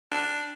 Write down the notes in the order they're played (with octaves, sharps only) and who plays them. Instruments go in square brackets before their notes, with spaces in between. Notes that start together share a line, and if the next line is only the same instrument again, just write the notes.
[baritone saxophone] D4